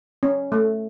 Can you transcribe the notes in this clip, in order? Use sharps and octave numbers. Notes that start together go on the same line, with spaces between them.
C#4
A3